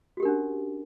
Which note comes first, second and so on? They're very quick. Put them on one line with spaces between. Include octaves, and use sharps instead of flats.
F#4 G4 A#4 D4 C#4